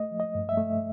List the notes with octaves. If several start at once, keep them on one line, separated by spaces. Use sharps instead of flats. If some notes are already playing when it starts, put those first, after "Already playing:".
Already playing: A3 D#5
F3
D#5
G2
E5
A3